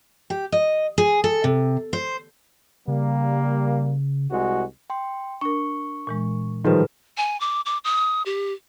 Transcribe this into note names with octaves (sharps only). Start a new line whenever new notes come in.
G4
D#5
G#4
A4
C3
C5
C#3 G3 A#3
C2 G#3 F#4
G5 C6
D4 A#4 C#6
A#2 E3 G#3
A2 D#3 F3 G3 G#4 A4 B4
G#5
D6
D6
D#6
G4